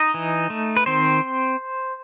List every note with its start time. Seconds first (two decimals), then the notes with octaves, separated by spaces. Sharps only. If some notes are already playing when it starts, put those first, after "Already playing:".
Already playing: D#4 D#5
0.14 E3
0.50 A3
0.77 B4
0.86 D#3 C4 C5